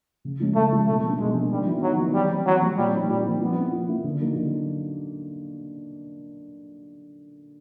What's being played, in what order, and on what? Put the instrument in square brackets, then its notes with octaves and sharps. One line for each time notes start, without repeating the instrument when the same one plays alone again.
[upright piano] C#3
F3 G#3 C#4
[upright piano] C#3 [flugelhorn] A3
[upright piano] F3 G#3 C#4
[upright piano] B2 [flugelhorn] A3
[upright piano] G3 A#3 D4
[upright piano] B2 [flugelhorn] G#3
[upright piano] G3 A#3 D4
[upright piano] D#3 [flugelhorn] G3
[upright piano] F#3 B3 E4
[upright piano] D#3 [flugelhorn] F#3
[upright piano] F#3 B3 E4
[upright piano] E3 [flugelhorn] G3
[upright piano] G3 C4
[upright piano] E3 [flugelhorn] F#3
[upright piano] G3 C4
[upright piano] A#2 [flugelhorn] G3
[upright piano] G3 C4 D#4
[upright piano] A#2 [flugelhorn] G3
[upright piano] G3 C4 D#4
[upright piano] F3 [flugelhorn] B3
[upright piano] A#3 C#4 E4
F3
A#3 C#4 E4
D3
F#3 A#3 D#4
D3